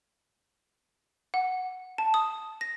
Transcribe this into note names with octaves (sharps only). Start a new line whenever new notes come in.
F#5
A5
D#6
A#6